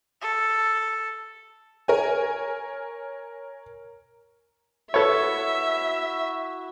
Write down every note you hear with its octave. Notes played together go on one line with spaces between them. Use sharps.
A4
A#4 C#5 G#5
E4 F#4 A4 B4 C#5 E5